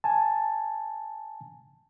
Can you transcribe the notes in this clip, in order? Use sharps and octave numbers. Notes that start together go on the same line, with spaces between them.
G#5 A5